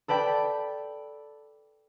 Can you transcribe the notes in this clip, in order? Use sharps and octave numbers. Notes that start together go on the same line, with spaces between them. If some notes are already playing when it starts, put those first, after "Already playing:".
A4 B4 D5 G5 B5